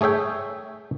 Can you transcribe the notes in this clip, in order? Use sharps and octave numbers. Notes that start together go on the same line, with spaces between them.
A3 G#4 C#5 E5 G5